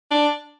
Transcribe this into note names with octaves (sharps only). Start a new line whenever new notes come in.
D4